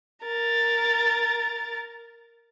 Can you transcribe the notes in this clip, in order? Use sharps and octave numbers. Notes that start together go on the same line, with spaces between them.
A#4 A6